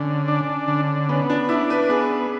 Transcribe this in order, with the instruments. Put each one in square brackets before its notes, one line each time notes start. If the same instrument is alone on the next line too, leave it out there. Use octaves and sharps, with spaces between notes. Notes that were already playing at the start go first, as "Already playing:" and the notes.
Already playing: [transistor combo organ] D3 [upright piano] C#4
[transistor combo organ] D4
D3
[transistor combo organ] B3 [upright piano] C#4
[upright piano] D4
[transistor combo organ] D4 [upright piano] E4
[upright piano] B4
[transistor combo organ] B3 [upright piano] G#4